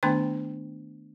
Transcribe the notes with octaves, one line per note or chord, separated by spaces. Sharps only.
D#3 A3 B3 D4 G5 C6